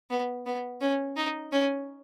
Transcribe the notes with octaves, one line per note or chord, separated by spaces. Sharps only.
B3
B3
C#4
D#4
C#4